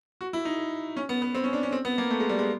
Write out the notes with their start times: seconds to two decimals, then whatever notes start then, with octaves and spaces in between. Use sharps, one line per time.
0.21 F#4
0.33 E4
0.45 D#4
0.96 C#4
1.09 B3
1.22 B3
1.35 C4
1.44 C#4
1.53 D4
1.63 C#4
1.72 C4
1.85 B3
1.98 A#3
2.10 A3
2.20 G#3
2.29 G3
2.39 G#3